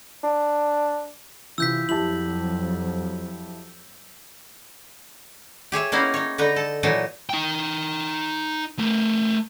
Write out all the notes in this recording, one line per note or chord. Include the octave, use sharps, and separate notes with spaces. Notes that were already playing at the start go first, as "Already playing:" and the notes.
D4
C3 E3 F4 E6 G6 B6
F2 F3 F#3 E4 G4 A5 F#7
G4 G#4 C#5 E5
A#3 B3 C#4 D#4 E4 F5
D#4 C#5
D3 D#4 B4 A#5
A4
A#2 E3 F#3 D#4 A4 G#5
D#4 G5
A3 A#4